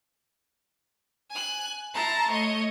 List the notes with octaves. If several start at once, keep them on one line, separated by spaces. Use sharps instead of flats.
G#5 F#6
E4 A5 A#5 C6
A3 C#5 D#5